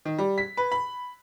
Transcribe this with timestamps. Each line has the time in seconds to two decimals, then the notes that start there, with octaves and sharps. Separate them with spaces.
0.05 D#3
0.18 G3
0.38 B6
0.57 B4
0.72 B5